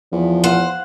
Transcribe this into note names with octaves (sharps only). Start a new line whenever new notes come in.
E2 F3
C5 F5 F#5